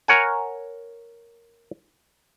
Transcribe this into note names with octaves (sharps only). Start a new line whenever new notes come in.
A#4 C#5 F#5 G#5